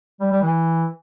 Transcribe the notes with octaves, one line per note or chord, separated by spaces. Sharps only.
G3
G3
E3